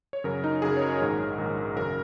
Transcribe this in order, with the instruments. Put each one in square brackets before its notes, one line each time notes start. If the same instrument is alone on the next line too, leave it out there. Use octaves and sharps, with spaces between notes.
[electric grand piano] C#5
F#2 C#3 F#3 A#4
D#4
F#2 C#3 F#3 G#4
C#5
A#4
A#1 G#2 D#3
A#1 G#2 D#3
F#2 C#3 A#4